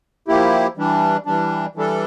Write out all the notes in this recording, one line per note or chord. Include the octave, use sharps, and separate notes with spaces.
F3 A#3 E4 G4
E3 G3 D4
E3 G3 D4
E3 G3 D4 A4